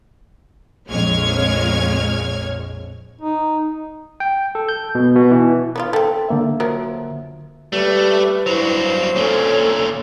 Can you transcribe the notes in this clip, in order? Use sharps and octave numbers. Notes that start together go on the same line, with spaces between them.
A#1 F2 G#3 C#5 F6 G#6
D#4
G5
A4
G6
B2
B2
E3
B3 D4 F4
A3 C4 A4 G5
D3 A#3 E5
F3 F#3 A#4
G3 A3 B4
G2 F#3 E4 C5
A#2 D3 C#4 A4 C#5